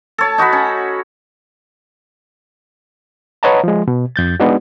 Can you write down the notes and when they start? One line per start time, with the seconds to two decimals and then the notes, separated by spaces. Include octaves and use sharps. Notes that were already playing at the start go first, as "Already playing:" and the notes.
0.18 A4 C#5 A5
0.38 D#4 F#4 F#5 B5
0.53 C#4
3.43 B4 C#5 D#5 F#5 A5 A#5
3.64 F3 G#3
3.88 B2
4.16 F2 G6 A6
4.40 G#3 B3 D4 D#4 F#4